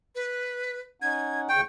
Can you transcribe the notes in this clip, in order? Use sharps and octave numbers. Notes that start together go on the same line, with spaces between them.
B4
C#4 D#4 F#5 G#6
D2 C#3 G5 C#6